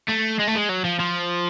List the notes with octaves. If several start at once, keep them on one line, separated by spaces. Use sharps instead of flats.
A3
G#3
A3
G#3
F#3
F3
F3